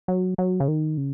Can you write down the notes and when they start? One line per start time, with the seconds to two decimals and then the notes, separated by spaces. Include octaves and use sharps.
0.08 F#3
0.38 F#3
0.60 C#3
0.68 D#3
0.97 C#3